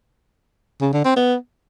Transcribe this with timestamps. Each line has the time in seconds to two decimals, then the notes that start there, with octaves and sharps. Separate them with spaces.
0.81 C#3
0.93 D3
1.05 C4
1.16 B3